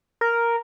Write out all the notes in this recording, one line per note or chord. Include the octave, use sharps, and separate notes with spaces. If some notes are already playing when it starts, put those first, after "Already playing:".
A#4